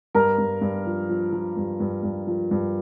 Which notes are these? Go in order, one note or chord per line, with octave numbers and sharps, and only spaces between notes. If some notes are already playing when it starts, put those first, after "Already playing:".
G2 A#4 A#5
G2
G2
F3
F3
F3
G2
G2
G2
F3
G2